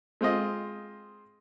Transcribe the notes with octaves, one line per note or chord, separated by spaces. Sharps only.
G#3 C4 F4 D#5